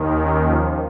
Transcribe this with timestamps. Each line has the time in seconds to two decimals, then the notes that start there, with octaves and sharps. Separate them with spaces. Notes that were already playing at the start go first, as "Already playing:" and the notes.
Already playing: D#2 D#3
0.18 C#4
0.46 F3